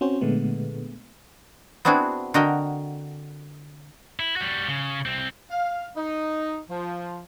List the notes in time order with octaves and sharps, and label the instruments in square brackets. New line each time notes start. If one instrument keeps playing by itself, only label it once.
[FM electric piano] C4 C#4 F#4 C5
A#2 D3 G#3 A3 B3
[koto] B3 C4 D4 E4 F#4 G#4
D3 F#4 A#4 D#5 G5
[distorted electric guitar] E4
G3 F#4
C#3
C2 C4
[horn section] F5
D#4
F3